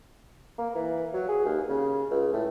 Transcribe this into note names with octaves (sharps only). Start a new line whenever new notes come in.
A#3
E3
F#3
G#4
D#2
C#3
C#2
A2